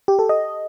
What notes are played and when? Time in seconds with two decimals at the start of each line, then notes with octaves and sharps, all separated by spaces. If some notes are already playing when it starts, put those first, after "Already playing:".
0.08 G4
0.19 A4
0.29 D#5